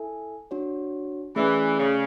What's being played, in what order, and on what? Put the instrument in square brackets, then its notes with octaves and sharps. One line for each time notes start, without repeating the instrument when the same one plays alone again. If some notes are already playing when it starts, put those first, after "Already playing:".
Already playing: [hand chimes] E4 A4 E5 G#5
D4 F#4 C#5
[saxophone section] E3 [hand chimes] A3 C#4 G#4 D5
[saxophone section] C#3